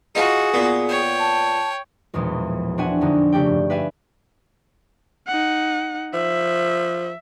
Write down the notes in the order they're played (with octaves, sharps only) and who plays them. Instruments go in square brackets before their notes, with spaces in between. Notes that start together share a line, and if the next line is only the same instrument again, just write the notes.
[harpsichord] D#4 F4 [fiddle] F#4 [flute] G#4
[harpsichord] A#2 B3
[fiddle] C#5 G5
[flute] A5
[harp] E1 B1 E2 A#2 F3 G#3
C4 D4 F#4 E5 F#5 G#5
F2 D3 F3 D#4
C#3 A3 G4 D5 G5
G2
B4 D5 E5 F5 G#5
[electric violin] D#4 F#5
[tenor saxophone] F3 [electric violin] E5